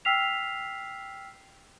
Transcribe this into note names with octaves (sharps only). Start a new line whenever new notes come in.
G5 E6 F6 B6 C7 F7